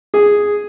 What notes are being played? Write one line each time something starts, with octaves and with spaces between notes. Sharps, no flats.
G#4